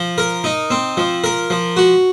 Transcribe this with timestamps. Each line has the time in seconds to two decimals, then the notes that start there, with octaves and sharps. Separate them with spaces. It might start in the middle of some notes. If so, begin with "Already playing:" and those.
Already playing: F3
0.18 A#4
0.44 D#4
0.70 C4
0.97 F3
1.24 A#4
1.50 F3
1.77 F#4